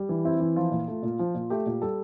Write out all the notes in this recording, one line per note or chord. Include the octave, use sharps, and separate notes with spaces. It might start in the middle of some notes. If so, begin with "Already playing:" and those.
Already playing: G3
E3
C4 E4
E3
F3 F4
A#2
A3
A#2
F3
A#2
A3 G4
A#2
G3 A4